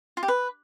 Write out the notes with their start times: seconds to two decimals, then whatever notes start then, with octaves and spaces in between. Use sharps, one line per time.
0.17 F4
0.23 G4
0.28 B4